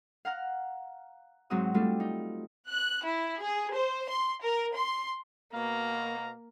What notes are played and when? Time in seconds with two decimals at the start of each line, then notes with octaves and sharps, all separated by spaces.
0.25 F5 F#5 A#5 F6 F#6
1.50 G#2 F#3 C4 D#4 F#5 D#6
1.74 G3 A3 C4 D4 F4 A4
2.00 D#4
2.69 F#6
3.04 E4
3.42 G#4
3.73 C5
4.09 C6
4.44 A#4
4.76 C6
5.53 B2 A#3 F5 A#5